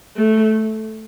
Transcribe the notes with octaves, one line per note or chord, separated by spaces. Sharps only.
A3